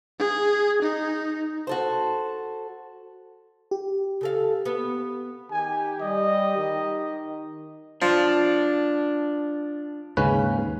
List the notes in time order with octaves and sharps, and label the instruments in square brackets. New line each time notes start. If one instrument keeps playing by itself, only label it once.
[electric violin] G#4
D#4
[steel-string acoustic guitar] F#4 A4 C5
[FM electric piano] G4
[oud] C#3 A4 F5
B3
[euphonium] D#3 [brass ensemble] G4 [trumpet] G#5
[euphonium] G3 [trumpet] D#5
[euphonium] D#3
[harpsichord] F3 [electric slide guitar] D4
[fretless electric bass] D#2 G#2 [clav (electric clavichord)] C#3 C#4 B4